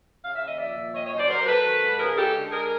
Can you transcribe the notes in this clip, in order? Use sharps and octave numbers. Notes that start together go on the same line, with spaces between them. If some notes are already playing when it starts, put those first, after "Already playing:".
C#3 F5
E5
D#2 D#5
F3 D5 E5
A#2
D#3 C#5 D#5
C#5 D#5
F#2
C5 D5
F#3 A#4 C5
A#4
F#3 A4 B4
D#3
G#2
C#3 G#4 A#4
G#3 G4 A4
D3
G#3 G#4 A#4